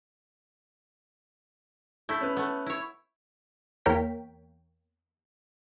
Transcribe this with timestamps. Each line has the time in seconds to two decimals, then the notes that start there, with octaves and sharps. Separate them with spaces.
2.09 A3 E4 G6 B6
2.21 C#4 B4
2.37 A3 B3
2.66 E4 C#5
3.86 E2 A#3 A#4 C#5 G5 B6